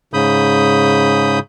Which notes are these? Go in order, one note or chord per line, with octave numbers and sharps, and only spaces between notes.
G#2 C#3 B5 D#6 G6